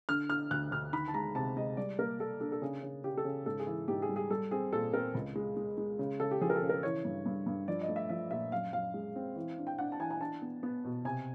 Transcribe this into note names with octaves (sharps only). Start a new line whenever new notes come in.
D3 F6
D3 F6
D2 F#6
D2 F6
D#3 B5
A5
G#3 A#5
C3 A5
G#3 D#5
G3 D5
A#3 A#4
A#3 A4
D4 A4
A4
C#3 G#4
C#3
C#3 G4
A4
C#3 G#4
G#2 A4
G#4
E3
G#2 G4
G#4
G3
G#4
G3 A4
C4 G#4
A#2 A4
C4 A#4
C#2
G#3
G#3
G#3
C#3
C#3 A4
G4
F3 G#4
A#4
A4
C#3
A#4
E3 C#5
G2
G2
G2
F3 D5
D#5
A3
E5
F3 E5
A#2 E5
F#2 F5
F#2 F5
G#3
C4
E3
D4
G5
D4 F#5
A5
E3 G#5
G#5
D4 A5
B3
B3
B2
C3 G#5